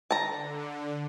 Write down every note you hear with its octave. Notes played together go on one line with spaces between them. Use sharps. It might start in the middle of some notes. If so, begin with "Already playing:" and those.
D3 A5 A#5